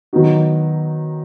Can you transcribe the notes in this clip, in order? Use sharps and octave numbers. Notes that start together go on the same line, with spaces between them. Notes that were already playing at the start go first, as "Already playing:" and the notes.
D#3 F#3 B3 D#4 F#4